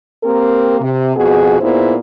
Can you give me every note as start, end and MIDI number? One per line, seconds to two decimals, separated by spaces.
0.24 0.81 58
0.24 0.81 60
0.24 0.81 67
0.24 0.81 70
0.81 1.15 48
1.17 1.58 41
1.17 1.58 47
1.17 1.58 59
1.17 1.58 66
1.17 1.58 68
1.61 1.95 46
1.61 1.95 59
1.61 1.95 63
1.61 1.95 64
1.61 1.95 68
1.61 1.95 72